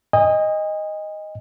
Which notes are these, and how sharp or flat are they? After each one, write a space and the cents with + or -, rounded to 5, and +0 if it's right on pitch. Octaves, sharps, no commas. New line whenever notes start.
D#5 +0 G#5 -40